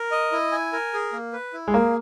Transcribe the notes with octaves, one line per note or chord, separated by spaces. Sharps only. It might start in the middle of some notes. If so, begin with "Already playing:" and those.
Already playing: A#4
D#5
E4
G#5
A#4
G#4
A#3
B4
E4
G#3
A#3 G#4